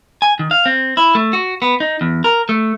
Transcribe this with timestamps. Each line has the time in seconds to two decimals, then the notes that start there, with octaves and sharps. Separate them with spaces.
0.22 G#5
0.39 D#3
0.51 F5
0.66 C4
0.97 E4
1.15 A3
1.33 F#4
1.62 B3
1.80 D#4
2.01 E2
2.24 A#4
2.49 A3